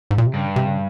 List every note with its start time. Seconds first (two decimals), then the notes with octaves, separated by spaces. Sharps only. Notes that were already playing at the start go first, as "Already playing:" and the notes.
0.11 G#2
0.18 A#2
0.26 C3
0.33 G2 C#3
0.56 C3
0.66 C#3